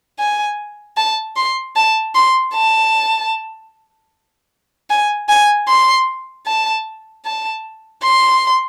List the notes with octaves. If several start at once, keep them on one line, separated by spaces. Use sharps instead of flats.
G#5
A5
C6
A5
C6
A5
G#5
G#5
C6
A5
A5
C6